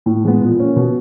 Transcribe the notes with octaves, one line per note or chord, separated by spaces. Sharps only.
A2
E3 G#3 B3
A#2
F3 A#3 C#4
B2